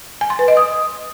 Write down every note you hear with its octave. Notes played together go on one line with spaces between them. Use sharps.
G#5
C6
B4
D#5
D#6